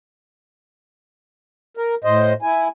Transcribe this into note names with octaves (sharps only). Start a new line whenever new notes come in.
A#4
A2 C5 D#5
E4 G#5